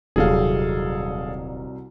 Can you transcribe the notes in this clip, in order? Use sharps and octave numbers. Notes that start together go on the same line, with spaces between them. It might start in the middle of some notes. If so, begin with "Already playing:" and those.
D#1 C2 F#3 G3 G#4 A4 F5